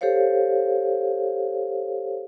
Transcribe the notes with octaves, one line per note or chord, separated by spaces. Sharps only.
G4 A4 C5 C#5 F5